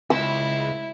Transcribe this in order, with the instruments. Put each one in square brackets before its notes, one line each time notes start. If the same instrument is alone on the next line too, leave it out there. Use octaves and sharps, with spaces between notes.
[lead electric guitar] C#2 [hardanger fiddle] E4 [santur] E6